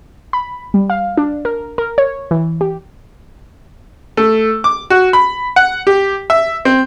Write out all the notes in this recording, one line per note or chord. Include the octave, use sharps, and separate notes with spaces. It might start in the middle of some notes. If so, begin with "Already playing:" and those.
B5
G3
F5
D4
A#4
A#4
C#5
E3
G4
A3
D6
F#4
B5
F#5
G4
E5
C4